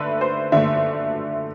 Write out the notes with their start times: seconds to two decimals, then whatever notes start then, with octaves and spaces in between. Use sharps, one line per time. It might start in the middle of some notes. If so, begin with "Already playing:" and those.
Already playing: D3 A3 B4 E5
0.21 C5
0.52 D3 A3 E5